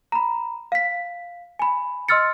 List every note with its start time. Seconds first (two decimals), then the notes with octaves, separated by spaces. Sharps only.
0.12 A#5 B5
0.72 F5 B6
1.59 G#5 B5
2.09 D#5 C6 E6 F6 A6 C#7